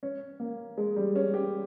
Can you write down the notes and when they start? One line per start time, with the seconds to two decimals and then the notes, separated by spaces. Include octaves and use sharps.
0.03 C#4
0.40 A#3
0.78 G#3
0.96 G3
1.16 C#4
1.34 G4